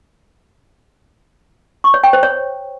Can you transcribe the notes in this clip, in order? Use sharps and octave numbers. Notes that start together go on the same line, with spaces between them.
C#6
C#5
G5
C5
C#5